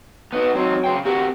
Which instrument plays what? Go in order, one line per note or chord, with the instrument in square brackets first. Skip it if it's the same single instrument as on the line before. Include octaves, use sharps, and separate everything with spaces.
[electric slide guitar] B3 D#4 F#4
[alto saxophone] F#3 [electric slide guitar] C4 D#4
[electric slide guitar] C#3 C5 G5
[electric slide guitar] C4 F#4 A#4 [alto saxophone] G4